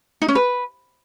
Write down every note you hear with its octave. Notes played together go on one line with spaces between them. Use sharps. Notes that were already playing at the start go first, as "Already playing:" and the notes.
D#4
C#4
B4